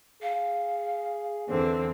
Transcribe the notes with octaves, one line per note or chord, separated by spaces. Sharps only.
G#4 F5
E2 D3 C4